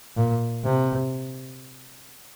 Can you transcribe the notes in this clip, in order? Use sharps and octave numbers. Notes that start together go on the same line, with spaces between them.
A#2
C3